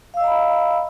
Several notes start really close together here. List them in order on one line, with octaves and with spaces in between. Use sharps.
F5 E6 D#5 A#5 B5